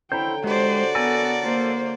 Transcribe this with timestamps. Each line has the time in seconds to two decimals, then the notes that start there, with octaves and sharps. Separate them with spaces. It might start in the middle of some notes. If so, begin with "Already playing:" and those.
0.12 D3 E4 C5 C#5 G5 A#5
0.44 G#3 F#4 G4 C5 D5
0.95 B3 A4 A#4 G#5
1.43 A#3 C5